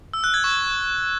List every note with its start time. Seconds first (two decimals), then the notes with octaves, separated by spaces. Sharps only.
0.13 E6
0.24 F#6
0.34 G#6
0.44 C#6